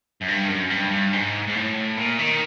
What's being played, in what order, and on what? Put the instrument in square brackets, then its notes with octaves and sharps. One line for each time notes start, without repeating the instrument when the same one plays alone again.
[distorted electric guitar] F#2
G2
F#2
G2
G2
G#2
G#2
A2
A#2
D#3